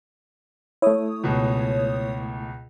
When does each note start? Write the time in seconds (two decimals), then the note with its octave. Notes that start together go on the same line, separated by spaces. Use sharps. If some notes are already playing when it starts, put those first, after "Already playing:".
0.82 A3 E4 C#5 D#6
1.24 C#2 B2